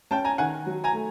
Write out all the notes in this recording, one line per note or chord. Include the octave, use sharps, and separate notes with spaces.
C#4 G5 A5
G#5 A#5
D#3 F#5 G#5
F#3
G#5 A#5
A3